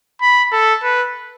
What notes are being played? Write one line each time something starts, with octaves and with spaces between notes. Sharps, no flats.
B5
A4
B4